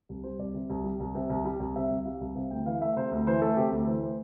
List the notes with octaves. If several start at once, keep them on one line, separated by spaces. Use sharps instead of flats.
C2
G3 C5
C2 D5
C3
C2
G3
C2
C3
C2
G3
C2
C3 E5
C2
G3 F5
C2
C3 F5
D2 G5
E3 F5
A3 E5
C3 C5
D2
E3 C5
A3 A4
C3 G4
D2 A4
E3 C5
A3 C5